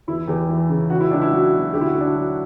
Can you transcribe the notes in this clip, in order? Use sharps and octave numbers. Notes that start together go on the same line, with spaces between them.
E2 E4
E2 G4
E3
C#3
C#2 F#4
E4
C#2 D4
E4
F#3 F#4
B2
D2 G4
E4
F#4
D2
D4
F#3